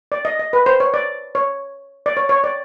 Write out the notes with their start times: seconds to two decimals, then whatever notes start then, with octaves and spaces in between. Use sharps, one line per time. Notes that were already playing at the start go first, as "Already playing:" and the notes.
0.12 D5
0.25 D#5
0.39 D#5
0.53 B4
0.66 C5
0.80 C#5
0.94 D5
1.35 C#5
2.06 D5
2.17 C#5
2.29 C#5
2.44 D5